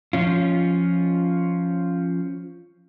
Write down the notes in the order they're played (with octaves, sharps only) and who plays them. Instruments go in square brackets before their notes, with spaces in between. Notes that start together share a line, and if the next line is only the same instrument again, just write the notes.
[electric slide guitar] F3 C#4 F4